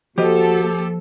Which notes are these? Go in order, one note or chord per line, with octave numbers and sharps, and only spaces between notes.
D#2 F3 F#4 G4 A4 C5 D#5